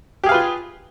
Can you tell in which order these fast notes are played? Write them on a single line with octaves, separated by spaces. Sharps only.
G4 G#4 F5 B4 F4